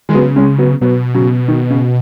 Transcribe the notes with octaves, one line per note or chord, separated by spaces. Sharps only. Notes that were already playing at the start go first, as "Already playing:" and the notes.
D#3 G#3
C#3 F#3 B3
G#3 C#4
F#3 B3
B2 F#3 B3
C#3 F#3
D#3
C#3